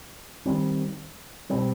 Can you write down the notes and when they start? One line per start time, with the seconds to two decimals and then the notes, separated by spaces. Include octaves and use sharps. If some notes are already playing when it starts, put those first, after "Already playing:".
0.46 D#3 G3 C4
1.50 B2 G3 C4